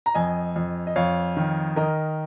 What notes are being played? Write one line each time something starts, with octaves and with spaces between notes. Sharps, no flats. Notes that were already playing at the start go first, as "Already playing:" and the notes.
A#5
F2 D#5 G#5
F2
D#5
F2 C#5 F5
D#3
D#3 A#4 D#5